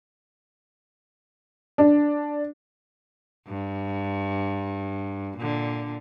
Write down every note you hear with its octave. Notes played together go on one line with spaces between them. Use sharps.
D4
G2
A#2 D3